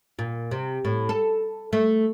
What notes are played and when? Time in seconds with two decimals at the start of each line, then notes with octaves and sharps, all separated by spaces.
0.19 A#2
0.51 C3
0.85 A2
1.09 A4
1.73 A3